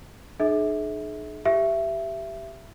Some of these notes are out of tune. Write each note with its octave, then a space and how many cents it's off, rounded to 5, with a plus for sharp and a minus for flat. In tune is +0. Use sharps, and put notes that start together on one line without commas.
D#4 -45 G#4 +40 E5 -30
G4 +0 E5 +15